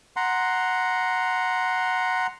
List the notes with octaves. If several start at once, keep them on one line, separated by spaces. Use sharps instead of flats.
F#5 A#5 C6